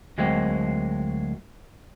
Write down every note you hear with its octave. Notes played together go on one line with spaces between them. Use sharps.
D2 F#3 G#3 A#3 C4